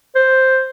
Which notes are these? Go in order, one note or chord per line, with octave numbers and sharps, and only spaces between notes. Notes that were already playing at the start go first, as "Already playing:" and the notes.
C5